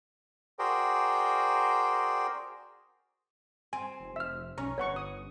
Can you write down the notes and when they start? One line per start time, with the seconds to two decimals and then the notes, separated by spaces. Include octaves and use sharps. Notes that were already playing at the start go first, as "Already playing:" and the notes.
0.59 F#4 G#4 A#4 C5 D5 G5
3.73 C4 G#5
4.00 F1
4.16 E5 E6 F6
4.58 B1 C#4 A#5
4.78 G1 B4 C#5 F#5 C#6
4.96 D#6